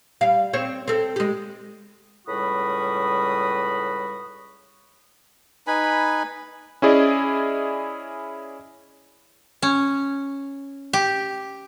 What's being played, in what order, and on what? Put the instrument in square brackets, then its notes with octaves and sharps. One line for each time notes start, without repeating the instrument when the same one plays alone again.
[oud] G3 F5
C4 C5 C#5
C4 A4
G#3 G4
[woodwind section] C#2 A2 G3 F#4 B5 D#6
[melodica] D#4 B4 G#5 B5
[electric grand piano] C#4 E4 G#4 D5 D#5
[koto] C#4
G4